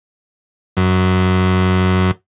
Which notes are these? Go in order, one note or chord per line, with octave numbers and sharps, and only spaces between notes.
F#2